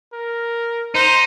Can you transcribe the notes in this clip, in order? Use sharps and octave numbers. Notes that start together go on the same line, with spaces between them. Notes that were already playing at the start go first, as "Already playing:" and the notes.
A#4
D#4 C5